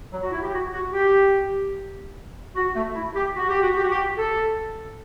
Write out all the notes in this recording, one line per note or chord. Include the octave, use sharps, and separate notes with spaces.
F#3
F#4
E4
G4
F#4
F#4
G4
F#4
A3
E4
G4
F#4
G4
F#4
G4
F#4
G4
A4